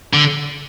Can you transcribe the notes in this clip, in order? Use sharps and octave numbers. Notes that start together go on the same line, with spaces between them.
D3